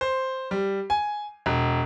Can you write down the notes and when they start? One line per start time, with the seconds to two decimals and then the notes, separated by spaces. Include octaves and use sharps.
0.01 C5
0.51 G3
0.90 G#5
1.46 E1